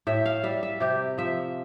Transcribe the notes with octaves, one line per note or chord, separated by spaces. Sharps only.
A2 E5
F5
G3 E5
E5
C3 G4
F3 E5